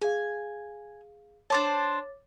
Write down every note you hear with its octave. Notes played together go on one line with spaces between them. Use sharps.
G#4 F5 G#5
D4 C5 C#5 A5 D6 A6